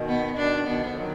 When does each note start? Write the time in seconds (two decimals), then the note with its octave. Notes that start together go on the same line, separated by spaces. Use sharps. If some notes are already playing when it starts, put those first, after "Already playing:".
Already playing: B2 D#3
0.08 B3
0.37 B2 D#3 D4
0.67 B2 D#3 B3
0.81 D3 F3
0.96 D#3 F#3